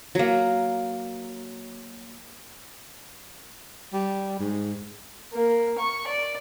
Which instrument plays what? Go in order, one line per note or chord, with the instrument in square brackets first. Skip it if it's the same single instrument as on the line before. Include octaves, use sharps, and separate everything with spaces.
[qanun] F#3 A#3
[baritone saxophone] G3
G#2
[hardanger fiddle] A#3
C#6
D5